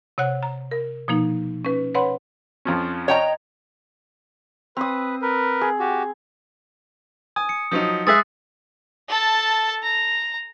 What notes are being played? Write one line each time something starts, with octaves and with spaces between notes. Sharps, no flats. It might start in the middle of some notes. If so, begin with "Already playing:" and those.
C3 C#5 F#5 F#6
A#5
A#4
B2 F3 A#3 D#4
C#4 B4
B4 C#5 F#5 B5 C6
F2 F3 C#4
C#5 D#5 G5 A#5
C4 B4 D#6
A#4 B4
G#4
F#4 G4
G#5 D#6
C#7
F3 F#3 D#4 D#6
G#3 G#4 E5 D#6 E6 F#6 A6 B6
A4 A5
A#5